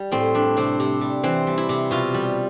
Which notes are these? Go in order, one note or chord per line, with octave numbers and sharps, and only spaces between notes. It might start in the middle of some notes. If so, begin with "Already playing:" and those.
Already playing: G3
A2 C4
G3 D4
C3 C4
C3
G3
E3 C4
G3
E4
C3
B2 F4
G3